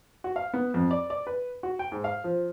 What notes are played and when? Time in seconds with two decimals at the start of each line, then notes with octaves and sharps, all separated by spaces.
0.24 F#4
0.36 F5
0.54 B3
0.74 F2
0.91 D5
1.10 D5
1.27 B4
1.63 F#4
1.79 G5
1.92 G#2
2.04 F5
2.24 F3